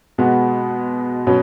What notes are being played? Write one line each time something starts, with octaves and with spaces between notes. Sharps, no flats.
B2 G#3 B3 F#4
B2 F#3 C#4